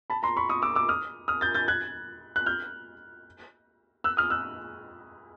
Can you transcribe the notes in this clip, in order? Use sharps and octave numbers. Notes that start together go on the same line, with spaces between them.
A5 B5
A#5 C6
B5 C#6
C#6 D#6
D6 E6
D6 E6
D#6 F6
D#6 F6
G6 A6
G6 A6
F#6 G#6
F#6
F6 G6
E6 F#6
D#6 F6
E6 F#6